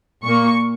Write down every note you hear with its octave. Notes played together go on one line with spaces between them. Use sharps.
A#2 A#3 C#6